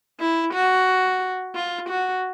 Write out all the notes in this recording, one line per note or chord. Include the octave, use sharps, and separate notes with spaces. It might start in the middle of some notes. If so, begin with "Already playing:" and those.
E4
F#4
F4
F#4